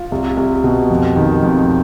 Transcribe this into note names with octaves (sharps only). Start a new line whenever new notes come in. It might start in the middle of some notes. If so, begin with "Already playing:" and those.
Already playing: F4
C2
C2
B2
F2
D#3
F2